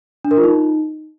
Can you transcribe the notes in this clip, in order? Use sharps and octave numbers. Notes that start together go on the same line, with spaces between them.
D4
A#4
F4
D#4